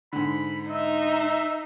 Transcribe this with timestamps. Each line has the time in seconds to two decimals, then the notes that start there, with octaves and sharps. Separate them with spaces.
0.13 G#2 D3 B5
0.70 D#4 E5